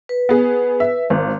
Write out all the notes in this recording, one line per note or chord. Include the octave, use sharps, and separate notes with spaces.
B4
B3 G#4
E5
G#1